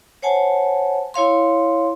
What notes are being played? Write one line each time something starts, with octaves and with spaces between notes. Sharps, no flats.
C5 C#5 F#5 G#5 A5
E4 C#5 F5 C6